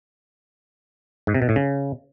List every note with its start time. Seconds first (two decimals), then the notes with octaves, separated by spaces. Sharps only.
1.27 G#2
1.34 C3
1.42 B2
1.49 A2
1.56 C#3